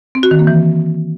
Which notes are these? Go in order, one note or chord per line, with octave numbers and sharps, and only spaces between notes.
C4
F#4
D#3
A#3
E3